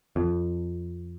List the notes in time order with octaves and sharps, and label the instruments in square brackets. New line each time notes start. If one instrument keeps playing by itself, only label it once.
[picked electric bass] F2